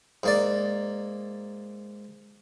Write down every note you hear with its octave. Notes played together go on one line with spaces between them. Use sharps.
G#2 A#3 D5